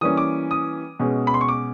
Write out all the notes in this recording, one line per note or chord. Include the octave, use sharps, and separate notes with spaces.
E3 G3 A#3 C#4 D#6
D6
D#6
B2 G#3 C#4
B5
C6
C#6
D6